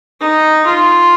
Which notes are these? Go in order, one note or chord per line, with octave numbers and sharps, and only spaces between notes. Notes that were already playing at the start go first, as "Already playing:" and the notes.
D#4
F4